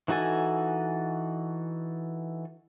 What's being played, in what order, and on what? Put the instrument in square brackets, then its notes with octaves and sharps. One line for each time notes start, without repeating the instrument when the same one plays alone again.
[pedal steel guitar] E3 D#4 F#4 A4 G#5